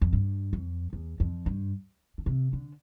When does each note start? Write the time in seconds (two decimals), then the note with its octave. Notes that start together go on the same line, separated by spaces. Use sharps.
0.02 F2
0.13 G2
0.53 F2
0.93 E2
1.20 F2
1.46 G2
2.18 D3
2.26 C3
2.53 D3